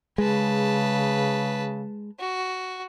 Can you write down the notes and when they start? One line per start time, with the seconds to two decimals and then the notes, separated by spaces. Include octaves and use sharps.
0.18 C#3 G#3 B4 A5
2.20 F#4